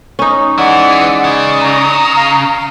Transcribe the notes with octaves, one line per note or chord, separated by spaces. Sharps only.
C#4 D#4
E3 G#3 D5 F#5
C#3
A#5
F5